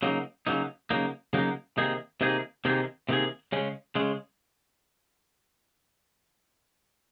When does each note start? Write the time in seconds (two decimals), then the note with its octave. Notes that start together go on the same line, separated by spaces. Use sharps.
0.03 C#3 F#3 A#3 D#4
0.47 C#3 F#3 A#3 D#4
0.90 C#3 F#3 A#3 D#4
1.33 C#3 F#3 A#3 D#4
1.78 C3 D#3 A#3 D#4 G#4
2.21 C3 D#3 A#3 D#4 G#4
2.65 C3 D#3 A#3 D#4 G#4
3.09 C3 D#3 A#3 D#4 G#4
3.52 C#3 G#3 C#4
3.95 C#3 G#3 C#4